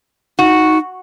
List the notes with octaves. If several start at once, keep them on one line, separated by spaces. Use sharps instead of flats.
D#4 F#4